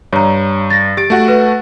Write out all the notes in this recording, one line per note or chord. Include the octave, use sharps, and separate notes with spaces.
G2 C#5 A#5
A6 A#6
G4 A6 D7
A3 F#4 F#5
B4